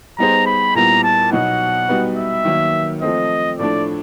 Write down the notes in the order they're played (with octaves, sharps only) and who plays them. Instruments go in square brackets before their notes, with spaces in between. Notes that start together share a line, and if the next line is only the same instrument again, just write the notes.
[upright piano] G3 B3 D#4 G#4 C5 [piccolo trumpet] A#5
[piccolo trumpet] B5
[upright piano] A#2 G3 B3 E4 [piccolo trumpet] A#5
[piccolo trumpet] A5
[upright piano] B2 F#3 B3 D#4 [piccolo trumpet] F#5
[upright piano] G3 B3 D#4 F#4 B4
[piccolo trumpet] E5
[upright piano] D#3 F#3 A#3
[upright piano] F3 A3 C4 [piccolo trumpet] D#5
[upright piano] A2 F3 A3 D4 [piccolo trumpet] D5